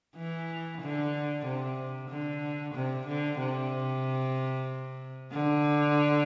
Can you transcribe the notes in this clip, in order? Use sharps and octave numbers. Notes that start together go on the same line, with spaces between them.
E3
D3
C3
D3
C3
D3
C3
D3